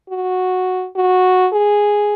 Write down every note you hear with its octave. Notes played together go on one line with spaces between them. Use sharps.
F#4
F#4
G#4